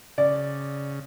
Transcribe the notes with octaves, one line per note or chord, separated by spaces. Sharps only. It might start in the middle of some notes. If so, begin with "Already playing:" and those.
C#3 D5